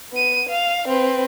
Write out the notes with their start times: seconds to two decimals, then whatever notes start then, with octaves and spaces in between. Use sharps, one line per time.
0.12 B3 D#7
0.49 F5
0.88 C4 B4